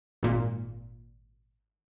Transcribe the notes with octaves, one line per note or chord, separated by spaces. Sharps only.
G#1 A#2